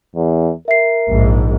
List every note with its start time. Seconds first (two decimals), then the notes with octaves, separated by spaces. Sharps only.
0.16 E2
0.68 A#4 E5 C7
1.09 A#1 G#2